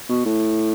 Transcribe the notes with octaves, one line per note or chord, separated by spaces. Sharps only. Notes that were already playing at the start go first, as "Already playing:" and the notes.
B2
A2